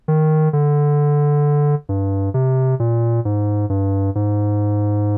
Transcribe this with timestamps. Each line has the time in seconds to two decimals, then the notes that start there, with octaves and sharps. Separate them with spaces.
0.08 D#3
0.53 D3
1.89 G2
2.34 C3
2.80 A#2
3.25 G#2
3.70 G2
4.15 G#2